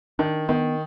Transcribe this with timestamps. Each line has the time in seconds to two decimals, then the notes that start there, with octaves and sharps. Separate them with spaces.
0.19 D#3 D4
0.49 D#3 B3